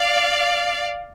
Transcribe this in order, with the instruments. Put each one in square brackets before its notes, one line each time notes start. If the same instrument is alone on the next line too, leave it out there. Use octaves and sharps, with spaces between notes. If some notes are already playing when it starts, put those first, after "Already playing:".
Already playing: [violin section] D5 F5